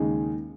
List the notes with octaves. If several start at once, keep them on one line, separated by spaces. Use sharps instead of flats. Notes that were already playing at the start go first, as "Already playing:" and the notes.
Already playing: D#2 C#3 G#3 D#4